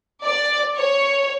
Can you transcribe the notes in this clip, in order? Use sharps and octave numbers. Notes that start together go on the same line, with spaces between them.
D5
C#5